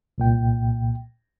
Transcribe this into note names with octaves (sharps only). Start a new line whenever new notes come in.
C2 A#2 G5